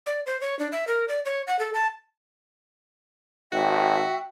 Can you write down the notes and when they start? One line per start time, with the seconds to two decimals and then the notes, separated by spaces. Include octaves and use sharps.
0.06 D5
0.26 C5
0.41 C#5
0.59 D4
0.72 E5
0.88 A#4
1.08 D5
1.25 C#5
1.47 F#5
1.59 A4
1.74 A5
3.52 G#1 F#4 E5 G5